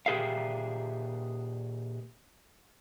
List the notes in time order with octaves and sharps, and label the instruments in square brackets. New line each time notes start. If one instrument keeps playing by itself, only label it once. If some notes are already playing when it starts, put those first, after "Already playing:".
[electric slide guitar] A#2 G4 G#4 E5 F5